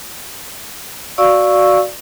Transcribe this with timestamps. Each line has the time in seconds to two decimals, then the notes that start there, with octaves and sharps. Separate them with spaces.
1.18 F#4 D5 F5 C#6 E6